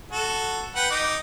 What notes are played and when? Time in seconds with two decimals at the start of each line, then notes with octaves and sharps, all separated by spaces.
0.11 F#4 A4
0.76 B4 F#5 G5
0.90 D#4 D6